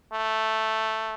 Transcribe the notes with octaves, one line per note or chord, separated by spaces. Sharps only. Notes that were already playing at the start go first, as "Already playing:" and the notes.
A3